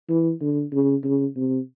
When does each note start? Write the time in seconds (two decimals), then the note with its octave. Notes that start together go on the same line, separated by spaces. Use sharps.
0.09 E3
0.41 D3
0.73 C#3
1.04 C#3
1.36 C3